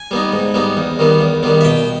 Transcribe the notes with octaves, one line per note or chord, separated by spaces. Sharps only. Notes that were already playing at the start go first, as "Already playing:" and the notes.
Already playing: G#5
G3 B3 D#4
G#2
G3 B3 D#4
E2
D#3 G3 B3
E2
D#3 G3 B3
E5
B2 G5